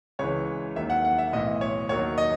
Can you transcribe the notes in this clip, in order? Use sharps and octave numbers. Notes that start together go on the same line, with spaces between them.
C#2 C#3 E3 C#5
D#2 D#3 F#3 E5
F#5
F#5
E5
B1 A2 E3 D#5
C#5
D#2 D#3 F#3 C#5
D#5